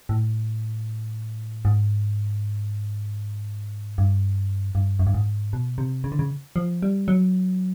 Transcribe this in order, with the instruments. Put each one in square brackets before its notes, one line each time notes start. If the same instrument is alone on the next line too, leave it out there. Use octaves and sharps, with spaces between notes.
[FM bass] A2
G#2
G2
G2
F#2
G2
G#2
B2
C3
C#3
D3
C#3
F3
G3
F#3